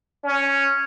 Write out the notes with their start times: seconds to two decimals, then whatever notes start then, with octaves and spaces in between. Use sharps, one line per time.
0.24 C#4